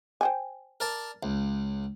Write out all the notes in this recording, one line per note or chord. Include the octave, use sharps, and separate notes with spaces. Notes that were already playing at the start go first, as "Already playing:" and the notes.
C5 G5 G#5
A#4 D5 A5
C#2